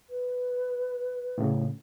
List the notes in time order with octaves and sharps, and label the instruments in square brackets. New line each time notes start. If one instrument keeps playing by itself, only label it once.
[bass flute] B4
[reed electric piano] A2 C#3